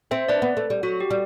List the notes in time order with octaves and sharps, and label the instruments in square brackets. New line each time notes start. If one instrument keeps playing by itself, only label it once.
[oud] C4 [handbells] C5 E5
[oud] D4 [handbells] B4 D5
[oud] B3
A3
G3
[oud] F#3 [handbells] F#4
[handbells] G4
[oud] G3